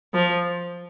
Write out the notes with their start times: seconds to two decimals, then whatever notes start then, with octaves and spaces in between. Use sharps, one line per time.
0.14 F3